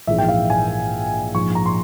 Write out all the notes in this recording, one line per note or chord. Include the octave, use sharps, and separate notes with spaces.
A#1 G#2 E3 G#3 E5
G5
F5
G#5
A#1 G#2 F3 G#3 C#6
A#5
C6